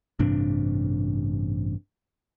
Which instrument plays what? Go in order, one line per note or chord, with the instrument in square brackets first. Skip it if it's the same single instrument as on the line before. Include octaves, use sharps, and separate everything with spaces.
[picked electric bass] A1 G2 C3 D4